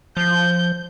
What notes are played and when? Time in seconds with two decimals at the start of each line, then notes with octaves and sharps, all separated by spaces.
0.17 F3 G6